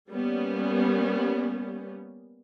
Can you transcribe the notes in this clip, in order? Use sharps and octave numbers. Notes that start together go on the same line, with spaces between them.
G3 A#3 B3 C#4